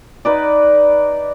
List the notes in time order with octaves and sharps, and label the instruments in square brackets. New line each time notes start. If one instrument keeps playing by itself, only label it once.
[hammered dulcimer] D#4 B4 D5